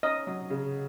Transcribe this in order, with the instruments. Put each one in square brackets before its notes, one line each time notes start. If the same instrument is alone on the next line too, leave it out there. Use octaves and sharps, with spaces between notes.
[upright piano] C#4 [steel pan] D#5
[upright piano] F#3
C#3